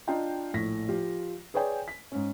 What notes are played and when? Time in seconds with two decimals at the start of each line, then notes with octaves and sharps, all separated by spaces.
0.07 D4 F4 D#5 F5 G5 A#5
0.54 A#1 A2 A#6 B6
0.89 F3 F4 G4
1.54 G#4 B4 C#5 D5 G5 G#5
1.88 B6
2.12 G#2 C#4